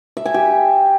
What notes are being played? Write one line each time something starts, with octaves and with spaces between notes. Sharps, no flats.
E5
G#5
G4